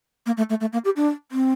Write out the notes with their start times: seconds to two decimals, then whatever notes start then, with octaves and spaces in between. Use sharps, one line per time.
0.26 A#3
0.37 A3
0.50 A3
0.61 A3
0.73 A#3
0.85 G4
0.96 D4
1.32 C4